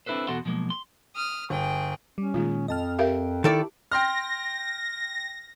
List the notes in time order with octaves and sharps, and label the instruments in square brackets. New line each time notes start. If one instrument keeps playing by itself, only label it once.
[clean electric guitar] C4 D4 E4 A4 B4 C5
E2 B2 F#4 A4 F#5 C6
B2 F3 F#3 G#3 A#3
C6
[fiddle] D#6 F6
[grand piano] G1 [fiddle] G#4 G5
[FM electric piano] G3 [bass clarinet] C#4
[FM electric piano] A#2 D#3 G#3 [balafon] F4
[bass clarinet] F2 [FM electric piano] D#5 A5 F6
[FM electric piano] G4 [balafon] A#4 E5 F5
[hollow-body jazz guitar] D#3 A4 D5 [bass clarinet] E4
[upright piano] G5 C6 F6 [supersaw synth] A#6